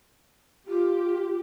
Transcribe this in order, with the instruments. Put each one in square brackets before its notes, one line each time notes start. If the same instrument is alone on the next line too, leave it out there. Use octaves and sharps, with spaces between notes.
[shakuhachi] F4 [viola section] G4